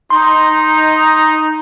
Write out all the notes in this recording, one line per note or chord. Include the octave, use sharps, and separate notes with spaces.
D#4 C6